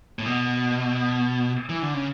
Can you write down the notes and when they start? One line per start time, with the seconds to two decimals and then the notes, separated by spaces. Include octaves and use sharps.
0.19 A2
0.26 B2
1.69 E3
1.82 D3
1.94 C#3